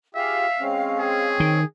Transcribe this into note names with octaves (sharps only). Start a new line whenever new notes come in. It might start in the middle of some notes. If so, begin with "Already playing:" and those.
F4 G4 G#4 E5 F5
G#3 C4 C#4
G#4
D#3